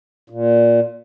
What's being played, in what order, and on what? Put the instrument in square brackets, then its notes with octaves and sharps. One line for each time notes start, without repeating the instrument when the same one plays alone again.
[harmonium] A#2